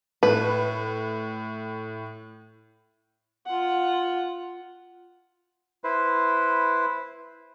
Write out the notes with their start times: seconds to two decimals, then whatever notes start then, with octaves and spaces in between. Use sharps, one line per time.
0.23 A2 B4
3.46 F4 F#5
5.84 E4 B4 C5